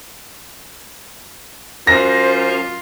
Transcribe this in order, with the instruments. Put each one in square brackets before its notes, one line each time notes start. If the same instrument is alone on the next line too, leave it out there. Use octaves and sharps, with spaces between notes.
[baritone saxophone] F#2 [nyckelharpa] F4 [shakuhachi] C5 [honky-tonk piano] A#6